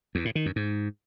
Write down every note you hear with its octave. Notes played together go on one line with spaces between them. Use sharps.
E2
A2
D#3
F#2
G#2